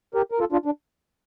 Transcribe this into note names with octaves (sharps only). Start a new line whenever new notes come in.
G4 A#4
A#4
F4 A4
D4 F4
D4